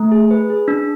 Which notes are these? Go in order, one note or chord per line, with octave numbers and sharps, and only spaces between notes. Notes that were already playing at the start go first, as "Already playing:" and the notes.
Already playing: A3
G#4
B4
G#4
D4